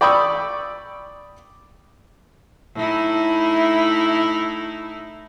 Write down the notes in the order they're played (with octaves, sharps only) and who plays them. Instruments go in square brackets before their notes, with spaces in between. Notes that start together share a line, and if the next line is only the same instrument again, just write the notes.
[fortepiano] D5 G5 B5 C#6 D#6 E6
[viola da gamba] A2 D#4 E4